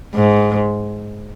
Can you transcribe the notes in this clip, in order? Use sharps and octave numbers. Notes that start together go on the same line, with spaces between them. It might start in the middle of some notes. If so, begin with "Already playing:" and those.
G#2